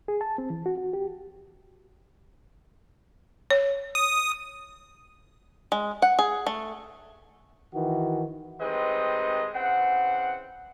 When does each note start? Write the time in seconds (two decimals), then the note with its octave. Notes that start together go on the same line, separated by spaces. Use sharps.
0.08 G#4
0.21 A5
0.38 C4
0.50 E3
0.66 F#4
0.78 F#4
0.93 G4
3.51 C#5
3.95 D#6
5.72 G#3
6.02 F#5
6.19 G#4
6.47 A3
7.74 D#3 E3 F#4
8.60 D#3 G3 G#3 C4 B4 D#5
9.54 C#3 E3 C4 F#5